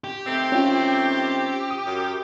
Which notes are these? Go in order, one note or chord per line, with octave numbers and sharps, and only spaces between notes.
G4
D#3 A3 C4
C#4 F4
D#6
F#2